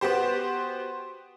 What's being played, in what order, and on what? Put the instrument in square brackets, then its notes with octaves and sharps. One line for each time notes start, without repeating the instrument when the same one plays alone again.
[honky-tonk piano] B3 F#4 G4 C5